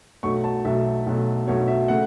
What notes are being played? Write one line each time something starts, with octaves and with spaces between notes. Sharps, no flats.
B1 B2 F#3 A3 C#6
A5
B1 B2 F#3 A3 E5
B1 B2 F#3 A3
B1 B2 F#3 A3 C#5
E5
C#3 A3 F#5